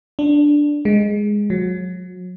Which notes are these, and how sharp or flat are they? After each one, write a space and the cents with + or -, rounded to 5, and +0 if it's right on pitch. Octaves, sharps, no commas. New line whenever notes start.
D4 +0
G#3 +0
F#3 -35